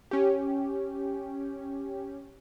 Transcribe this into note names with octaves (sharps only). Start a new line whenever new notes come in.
C#4 G4